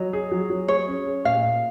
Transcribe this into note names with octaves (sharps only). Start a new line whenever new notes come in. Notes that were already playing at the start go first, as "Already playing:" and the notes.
Already playing: F#3 D#5
G#4
F#3
F#3
G#4 C#5
C#4
G#4
A#2 F5
A#2